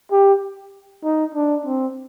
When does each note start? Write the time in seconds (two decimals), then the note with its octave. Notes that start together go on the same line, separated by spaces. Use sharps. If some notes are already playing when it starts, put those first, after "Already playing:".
0.12 G4
1.04 D#4
1.35 D4
1.66 C4